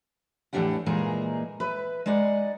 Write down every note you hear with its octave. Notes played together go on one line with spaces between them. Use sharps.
E2 A2 A#3 D4 G4 F#5
A#2 E3 G#3 A#3 D#4 G#4
B4 E5
G#3 D#4 D5 F#5